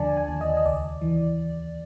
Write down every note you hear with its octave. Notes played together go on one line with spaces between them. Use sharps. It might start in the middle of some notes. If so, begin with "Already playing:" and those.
Already playing: D#2 D3 F3 D5 G#5 A5
G#5
D#2
D#5
D#5
C#2 D5
E3